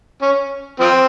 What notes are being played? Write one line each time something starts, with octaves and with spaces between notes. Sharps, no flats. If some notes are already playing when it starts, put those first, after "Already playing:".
C#4
F3 C4